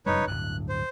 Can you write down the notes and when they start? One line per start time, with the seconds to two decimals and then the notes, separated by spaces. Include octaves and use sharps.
0.06 F1 F#2 G3 D#4 B4 C#5
0.28 D1 G2 F#6
0.69 C5